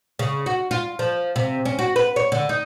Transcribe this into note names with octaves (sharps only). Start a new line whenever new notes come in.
C#3
F#4
F4
F3
C3
C#4
F#4
B4
C#5
D3
D#4